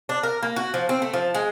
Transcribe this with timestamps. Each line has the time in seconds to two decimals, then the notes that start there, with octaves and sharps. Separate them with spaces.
0.09 D4
0.23 A#4
0.43 A#3
0.56 F#4
0.74 F3
0.89 C4
1.02 A3
1.13 F3
1.34 G#3